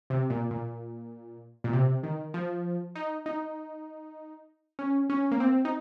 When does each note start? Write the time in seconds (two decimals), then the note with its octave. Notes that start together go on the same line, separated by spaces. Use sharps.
0.10 C3
0.30 A#2
0.51 A#2
1.64 A#2
1.73 C3
2.03 D#3
2.34 F3
2.95 D#4
3.26 D#4
4.79 C#4
5.10 C#4
5.32 A#3
5.40 C4
5.65 D#4